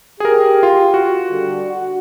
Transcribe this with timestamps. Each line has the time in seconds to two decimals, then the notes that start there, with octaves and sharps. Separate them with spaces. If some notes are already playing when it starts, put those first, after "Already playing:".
0.20 G4 G#4 A#4
0.63 F4
0.94 F#4
1.31 D3 G3
1.68 F#4